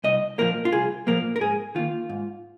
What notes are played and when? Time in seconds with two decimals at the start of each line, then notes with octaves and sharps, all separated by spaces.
0.04 C2 D#5
0.38 A#2 F3 A#3 A#4
0.65 F4
0.72 C2 G#4
1.07 A#2 F3 A#3 A#4
1.36 A#4
1.41 G#2 G#4
1.75 D#3 A#3 F4
2.09 G#2